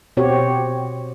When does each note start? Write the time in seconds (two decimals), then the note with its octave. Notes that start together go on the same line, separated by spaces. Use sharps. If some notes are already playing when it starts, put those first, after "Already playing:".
0.17 B2 C4 F#4 G4 C#5